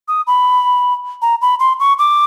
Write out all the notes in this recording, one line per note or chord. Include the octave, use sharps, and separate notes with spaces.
D#6
B5
A#5
B5
C6
C#6
D6